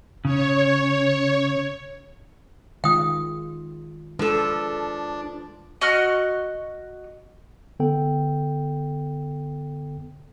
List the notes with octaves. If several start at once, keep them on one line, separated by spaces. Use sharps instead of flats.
C#3 C#5
D#3 G#3 F4 G5 D#6
F3 G#3 D4 A4 B4
F#4 D#5 F#5 F6
D3 B3 A4 G5